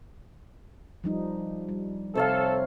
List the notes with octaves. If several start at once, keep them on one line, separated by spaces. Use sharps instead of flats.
F3 G3 D#4
G3
C3 A4 C#5 F5